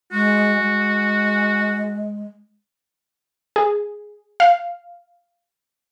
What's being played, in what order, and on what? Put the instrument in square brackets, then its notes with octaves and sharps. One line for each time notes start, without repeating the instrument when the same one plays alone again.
[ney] G#3 [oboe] F#4
[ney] G#3
[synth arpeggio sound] G#4
F5